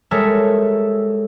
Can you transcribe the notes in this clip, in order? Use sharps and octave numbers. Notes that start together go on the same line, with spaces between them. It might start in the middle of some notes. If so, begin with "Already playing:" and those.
G3 G#3 A4 A#4 C#5 E5